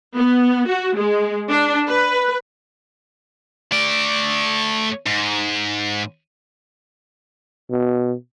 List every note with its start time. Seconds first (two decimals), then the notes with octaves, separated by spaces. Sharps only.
0.16 B3
0.68 F#4
0.97 G#3
1.49 D4
1.89 B4
3.72 A3 D5
5.06 G#2
7.70 B2